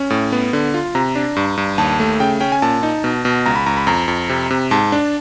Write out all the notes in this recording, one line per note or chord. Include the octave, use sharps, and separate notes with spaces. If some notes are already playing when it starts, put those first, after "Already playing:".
Already playing: C#4
A2
B3
D3
F4
C3 A#5
D4
G2
G2
D#2 A5
A3
C#3 G5
C#4 G5
G#5
A#2 A5
D#4
B2
B2
C#2 A#5
B5
C#2 A#5
B5
F2 A#5
F2
C3
C3
G#2 A5
D4